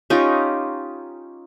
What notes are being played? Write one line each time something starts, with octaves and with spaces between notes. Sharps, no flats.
C#4 D#4 F4 G4